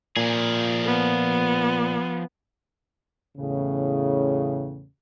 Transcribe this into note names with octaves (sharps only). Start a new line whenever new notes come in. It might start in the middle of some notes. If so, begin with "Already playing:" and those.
A#2 F3 G#4
B3
E2 A2 C#3